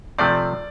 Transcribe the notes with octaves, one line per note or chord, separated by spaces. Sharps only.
C3 F3 A3 C4 D5